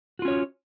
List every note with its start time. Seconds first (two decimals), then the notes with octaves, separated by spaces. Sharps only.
0.19 F#4
0.22 F4
0.25 C#4
0.28 C#5